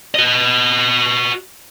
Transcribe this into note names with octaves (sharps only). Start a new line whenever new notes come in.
F#4 D#5